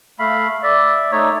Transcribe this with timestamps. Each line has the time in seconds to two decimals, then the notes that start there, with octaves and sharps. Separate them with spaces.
0.19 A3 F5 B5
0.63 D5 E5
1.12 A3 D#4 C#5